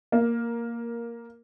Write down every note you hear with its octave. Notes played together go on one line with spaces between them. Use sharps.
A#3